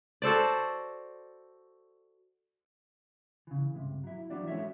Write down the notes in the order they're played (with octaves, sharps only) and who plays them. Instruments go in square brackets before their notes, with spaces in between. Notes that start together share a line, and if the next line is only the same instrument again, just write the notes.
[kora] F#4 A4 C5 D5
[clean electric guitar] C#3 E3
C#2 G2 C3
F#3 E4
E3 F#3 D4 E4 F#4 D5
G#3 C#4 F#4 A4 C#5 E5